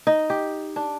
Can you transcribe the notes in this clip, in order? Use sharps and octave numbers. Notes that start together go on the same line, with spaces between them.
D#4
G4
D4